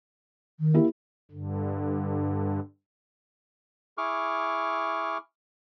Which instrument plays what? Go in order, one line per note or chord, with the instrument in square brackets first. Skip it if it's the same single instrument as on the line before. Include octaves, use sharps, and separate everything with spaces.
[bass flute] D#3
[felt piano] A#3 E4 G4
[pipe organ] G2 D3
[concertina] E4 G#4 C#6 D6 F6